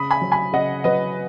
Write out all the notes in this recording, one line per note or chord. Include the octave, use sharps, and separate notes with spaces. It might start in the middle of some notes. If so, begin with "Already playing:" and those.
Already playing: C#3 B5 D#6
G#5 B5
F#3
G#5 B5
C#3 D#5 F#5
F#3 B4 D#5